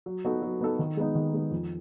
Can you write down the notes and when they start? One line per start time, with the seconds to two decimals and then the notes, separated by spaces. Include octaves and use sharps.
0.06 F#3
0.24 B3 D#4 F#4 A4
0.42 F#3
0.61 B3 D#4 F#4 A4
0.79 D#3
0.97 G#3 B3 D#4
1.15 D#3
1.34 G#3 B3 D#4
1.51 F2